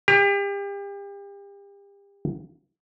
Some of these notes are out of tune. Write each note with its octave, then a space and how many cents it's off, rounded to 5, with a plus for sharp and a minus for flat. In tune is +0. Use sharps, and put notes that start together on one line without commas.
G4 +35